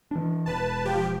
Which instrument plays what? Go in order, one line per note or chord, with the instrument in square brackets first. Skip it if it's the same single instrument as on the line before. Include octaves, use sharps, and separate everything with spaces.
[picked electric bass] E3 D4
[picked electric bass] E1 [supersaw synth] B4 A5
[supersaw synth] F3 G4